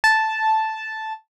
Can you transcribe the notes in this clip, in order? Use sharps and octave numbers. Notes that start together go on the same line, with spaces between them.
A5